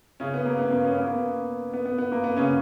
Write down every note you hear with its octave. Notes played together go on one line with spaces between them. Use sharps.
C#3 C#4
B3
A#3
B3
A#3
C#4
B3
A#3
B3
B3
B3
B3
A#3
B3
C#3 C#4